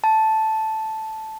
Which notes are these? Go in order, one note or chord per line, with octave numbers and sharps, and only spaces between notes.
A5